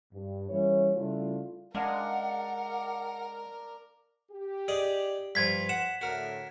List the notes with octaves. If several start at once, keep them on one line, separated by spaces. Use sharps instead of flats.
G2
E3 G3 A#3 C#4 E4 C#5
C#3 G3 A3 D4 E4 F4
G#3 D4 A#4 F5 F#5
G4
G#4 D5 D#5
G2 F3 G#6 B6
F#5 E7
A2 D3 F#4 A#4